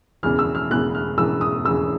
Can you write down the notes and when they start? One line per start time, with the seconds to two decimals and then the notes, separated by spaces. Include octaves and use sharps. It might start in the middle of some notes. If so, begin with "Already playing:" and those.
0.23 E1 E2 C#3 E3 F6
0.39 E6
0.55 F6
0.71 E1 E2 C#3 E3 F#6
0.95 F6
1.18 E1 E2 C#3 E3 E6
1.41 D#6
1.65 E1 E2 C#3 E3 E6